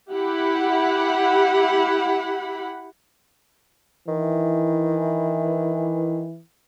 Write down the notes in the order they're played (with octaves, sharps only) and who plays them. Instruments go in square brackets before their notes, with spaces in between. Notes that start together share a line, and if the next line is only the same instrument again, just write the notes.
[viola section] E4 G4 F#5 B5
[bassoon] D#3 [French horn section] E3